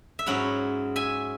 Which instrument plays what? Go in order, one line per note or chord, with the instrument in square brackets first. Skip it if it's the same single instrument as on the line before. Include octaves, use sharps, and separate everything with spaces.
[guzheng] E5
G#2 F#3 C#4 E4 C#5 F#5
E5 G#5